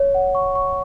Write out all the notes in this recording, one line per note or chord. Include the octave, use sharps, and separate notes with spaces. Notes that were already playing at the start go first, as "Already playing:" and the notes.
Already playing: C#5
F#5
C#6
C#6